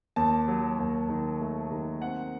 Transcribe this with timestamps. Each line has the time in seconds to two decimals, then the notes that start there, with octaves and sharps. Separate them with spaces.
0.16 D#2 A5
0.48 F#3
0.79 D#2
1.09 D#3
1.40 A3
1.71 D#3
2.02 C4 F#5